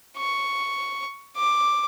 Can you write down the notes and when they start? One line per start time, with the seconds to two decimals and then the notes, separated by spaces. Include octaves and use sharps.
0.17 C#6
1.36 D6